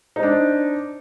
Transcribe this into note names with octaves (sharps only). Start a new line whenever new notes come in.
C4 D4 D#4